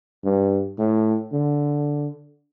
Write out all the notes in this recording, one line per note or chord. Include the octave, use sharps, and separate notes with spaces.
G2
A2
D3